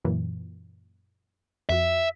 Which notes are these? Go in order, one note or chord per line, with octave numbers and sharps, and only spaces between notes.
F#2 A#2 E3
F2 F#4 E5